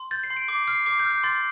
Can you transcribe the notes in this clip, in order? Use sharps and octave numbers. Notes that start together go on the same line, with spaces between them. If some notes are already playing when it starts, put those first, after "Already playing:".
Already playing: C6
G6 A6
C7
C6
D7
D6 C7
F6 C7
D6 C7
G6
F6
G6
C6 A6